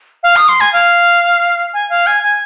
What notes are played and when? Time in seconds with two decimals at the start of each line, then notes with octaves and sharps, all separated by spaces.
0.23 F5
0.36 D#6
0.48 C6
0.61 G#5
0.73 F5
1.74 G#5
1.90 F5
2.07 G#5
2.23 G#5